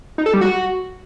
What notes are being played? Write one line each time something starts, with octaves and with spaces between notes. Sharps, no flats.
D#4
A4
G3
F#4